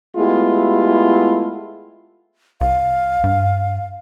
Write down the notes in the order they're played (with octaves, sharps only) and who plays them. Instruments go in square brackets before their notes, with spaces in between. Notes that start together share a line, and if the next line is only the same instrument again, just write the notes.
[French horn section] G#3 A3 B3 E4 F4 G4
[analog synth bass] C2 [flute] F5
[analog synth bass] G2